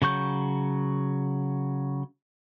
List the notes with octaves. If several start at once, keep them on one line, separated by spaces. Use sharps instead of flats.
C#3 F#3 C#6 G6